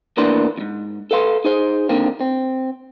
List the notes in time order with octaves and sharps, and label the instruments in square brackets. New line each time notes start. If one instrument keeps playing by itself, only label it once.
[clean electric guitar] E2 A2 A#3 D4 B4 C6
E2 G#2
A4 B4 F5 C6
D#4 G#4 C5
D3 D#3 A#3 C4
C4